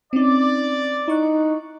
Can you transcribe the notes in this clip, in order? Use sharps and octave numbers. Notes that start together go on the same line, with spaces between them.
C4 C#4 D#4 D5
D#4 E4 C#6 F#6